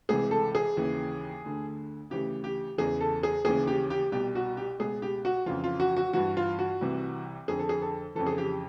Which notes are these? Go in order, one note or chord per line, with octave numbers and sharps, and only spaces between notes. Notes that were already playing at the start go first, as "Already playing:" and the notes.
C#2 C3 E3 G#4
A4
G#4
D#2 C#3 E3
D2 D3
D2 C#3 E3 G4
G4
E2 C#3 E3 G#4
A4
G#4
D#2 C#3 E3 G#4
G4
G4
C2 B2 G4
F#4
G4
C#2 B2 G#4
G4
F#4
F2 C#3 E3 F4
F4
F#4
F#4
G2 E3 F#4
F4
F#4
C2 C3 E3
F2 D3 G#4
A4
G#4
A4
F2 C#3 E3 A4
G#4
G4